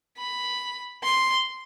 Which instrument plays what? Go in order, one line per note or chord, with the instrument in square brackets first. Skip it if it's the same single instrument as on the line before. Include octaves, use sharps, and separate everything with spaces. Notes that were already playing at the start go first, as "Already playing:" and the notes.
[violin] B5
C6